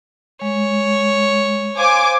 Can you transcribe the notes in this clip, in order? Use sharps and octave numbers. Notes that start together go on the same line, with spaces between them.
G#3 C#5
C5 F5 G#5 D6